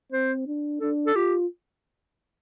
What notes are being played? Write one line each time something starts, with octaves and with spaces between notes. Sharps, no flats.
C4 C5
D4
D4 A4
A4
F4 G4